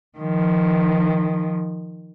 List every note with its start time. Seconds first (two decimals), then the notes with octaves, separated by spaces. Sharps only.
0.19 D#3 F3